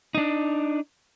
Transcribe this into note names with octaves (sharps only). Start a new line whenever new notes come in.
D4 D#4